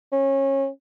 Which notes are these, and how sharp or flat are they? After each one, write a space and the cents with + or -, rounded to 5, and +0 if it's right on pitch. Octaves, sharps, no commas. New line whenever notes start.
C#4 -25